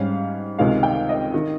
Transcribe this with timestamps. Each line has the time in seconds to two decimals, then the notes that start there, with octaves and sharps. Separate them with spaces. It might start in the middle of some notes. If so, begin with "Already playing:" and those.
Already playing: G#2 G3 C#4 F5
0.59 C#2 C3 D#3 G#3 F5
0.83 G5
1.09 D#5
1.34 D#3